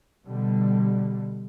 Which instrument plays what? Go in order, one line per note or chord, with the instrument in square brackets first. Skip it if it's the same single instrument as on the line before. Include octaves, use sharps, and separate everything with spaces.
[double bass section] B2 D3 G3